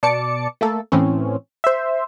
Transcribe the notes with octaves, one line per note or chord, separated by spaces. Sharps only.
B2 D5 A5 D6 C#7
A3 A#3 A4
A2 E3 C4 C#4
C5 E5